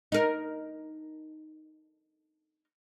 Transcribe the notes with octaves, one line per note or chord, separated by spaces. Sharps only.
D#4 A#4